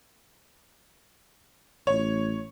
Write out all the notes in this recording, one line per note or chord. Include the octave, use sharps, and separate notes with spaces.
A1 C#5